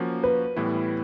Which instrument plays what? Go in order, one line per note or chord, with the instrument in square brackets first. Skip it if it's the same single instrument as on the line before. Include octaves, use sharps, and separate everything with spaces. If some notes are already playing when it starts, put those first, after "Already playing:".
Already playing: [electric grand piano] F3 A#3 C#4 F#4
[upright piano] B4
[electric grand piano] A2 E3 G3 B3 E4